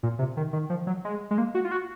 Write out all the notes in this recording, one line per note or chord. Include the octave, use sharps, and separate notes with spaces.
A#2
C3
D#3
D#3
F3
F#3
G#3
G#3
A#3
F#4
F4
F#4